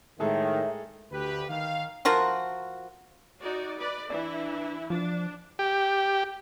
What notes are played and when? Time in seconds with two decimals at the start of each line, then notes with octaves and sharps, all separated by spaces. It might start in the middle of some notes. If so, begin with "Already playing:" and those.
0.20 A2 D#3 G#3 G#4 A4 E5
1.12 D2 G4 B4
1.50 D#3 F5
2.05 F3 F4 F#4 A#4
3.40 D#4 F#4 D5
3.78 B4 D5
4.10 E3 D4 E4
4.90 F3 D4
5.59 G4